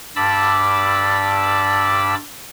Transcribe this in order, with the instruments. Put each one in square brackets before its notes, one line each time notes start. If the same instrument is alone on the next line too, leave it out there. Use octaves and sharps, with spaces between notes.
[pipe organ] G2 D5 A5 B5 D6 E6